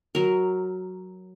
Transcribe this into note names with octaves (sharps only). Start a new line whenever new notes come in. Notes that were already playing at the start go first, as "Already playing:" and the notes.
F#3 A#4